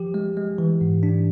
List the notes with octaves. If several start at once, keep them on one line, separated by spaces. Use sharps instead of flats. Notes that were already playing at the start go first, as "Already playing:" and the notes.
Already playing: F3 G4
G#3
G#3
E3
G#2
D4